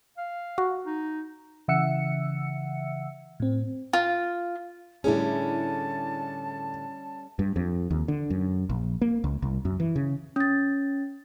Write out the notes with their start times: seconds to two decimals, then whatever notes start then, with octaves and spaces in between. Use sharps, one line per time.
0.18 F5
0.58 F#4
0.86 D#4
1.68 C#3 E3 E5 F#5 E6 C#7
3.40 A2 C4
3.93 F4
5.04 A2 D3 G3 A3 C#4 E4 G#4 A5
7.39 G2
7.56 F2
7.91 D#2
8.08 D3
8.30 F#2
8.69 A#1
9.01 A#3
9.24 C#2
9.42 C2
9.65 F#2
9.80 E3
9.96 C#3
10.36 C#4 A6